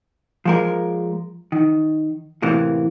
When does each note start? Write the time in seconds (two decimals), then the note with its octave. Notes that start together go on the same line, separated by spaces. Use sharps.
0.45 F3 G#3 A#4
1.52 D#3
2.42 A2 C3 E3 A#3